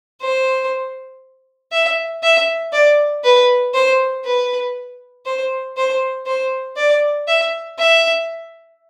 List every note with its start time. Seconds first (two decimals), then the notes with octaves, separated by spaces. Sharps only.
0.21 C5
1.72 E5
2.23 E5
2.73 D5
3.24 B4
3.74 C5
4.25 B4
5.26 C5
5.77 C5
6.26 C5
6.77 D5
7.28 E5
7.79 E5